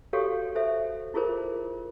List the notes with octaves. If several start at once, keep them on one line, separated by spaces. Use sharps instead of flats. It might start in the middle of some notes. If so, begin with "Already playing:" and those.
F#4 G4 A4 C#5 F5
A4 C5 E5
E4 F4 G#4 A#4 C5